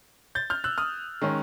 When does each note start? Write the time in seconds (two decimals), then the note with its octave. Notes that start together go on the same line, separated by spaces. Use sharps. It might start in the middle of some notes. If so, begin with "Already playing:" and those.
0.35 G6 A6
0.50 F6 G6
0.64 E6 F#6
0.78 D#6 F6
1.22 D#3 G#3 C#4